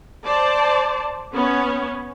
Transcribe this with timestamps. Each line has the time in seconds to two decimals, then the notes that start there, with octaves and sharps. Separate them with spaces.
0.25 C5 D5 A5
1.33 B3 C#4 C#5